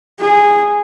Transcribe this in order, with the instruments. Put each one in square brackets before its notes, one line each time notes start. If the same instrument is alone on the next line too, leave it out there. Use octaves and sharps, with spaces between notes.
[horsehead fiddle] G#4